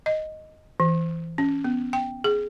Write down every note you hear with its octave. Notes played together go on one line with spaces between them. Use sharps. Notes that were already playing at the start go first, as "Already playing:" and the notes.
D#5
E3
C#4
B3
G5
G#4